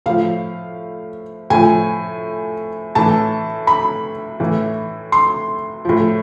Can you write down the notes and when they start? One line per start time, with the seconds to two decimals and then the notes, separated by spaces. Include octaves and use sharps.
0.06 A2 F3 F5
1.50 A2 F3 G#5
2.95 A2 E3 A5
3.67 B5
4.40 A2 E3
5.12 C6
5.85 A2 F3